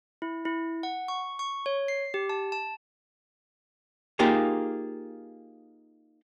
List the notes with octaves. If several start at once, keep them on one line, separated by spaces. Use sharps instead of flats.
E4
E4
F#5
C#6
C#6
C#5
C7
G4
A5
A5
A#3 D#4 F4 G4 G#4